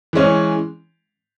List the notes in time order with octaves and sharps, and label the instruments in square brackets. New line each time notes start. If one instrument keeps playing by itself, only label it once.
[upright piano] E3 G#3 C#4